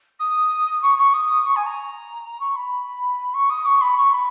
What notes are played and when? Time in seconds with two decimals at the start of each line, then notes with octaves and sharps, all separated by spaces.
0.19 D#6
0.82 C#6
0.98 C#6
1.13 D#6
1.45 C#6
1.56 G#5
1.66 A#5
2.40 C#6
2.56 B5
3.34 C#6
3.50 D#6
3.66 C#6
3.81 B5
3.97 C#6
4.14 B5